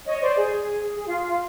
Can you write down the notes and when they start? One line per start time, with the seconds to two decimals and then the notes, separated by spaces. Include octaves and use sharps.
0.06 C#5 D#5
0.20 C5 D5
0.36 G#4
0.97 G#4
1.07 F4
1.27 F4